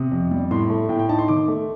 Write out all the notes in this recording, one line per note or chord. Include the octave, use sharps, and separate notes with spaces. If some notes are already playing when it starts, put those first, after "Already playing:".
Already playing: C3 D#6
F2
G3
A2 C6
A3
A2 G5
G5
D#4 A5
C6
D#3 D6
A3